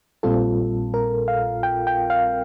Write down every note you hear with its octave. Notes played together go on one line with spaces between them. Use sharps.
A#1 A#2 G3 C4 F4 A4
A#4
F5
G5
G5
F5